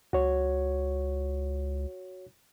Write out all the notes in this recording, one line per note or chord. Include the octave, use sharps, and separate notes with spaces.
C#2 F#4 C#5